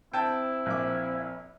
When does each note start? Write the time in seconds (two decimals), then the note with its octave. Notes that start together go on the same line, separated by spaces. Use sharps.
0.13 C4 E4 G5 A5
0.66 A#1 D6